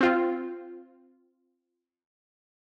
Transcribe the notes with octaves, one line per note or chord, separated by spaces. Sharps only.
C4 F4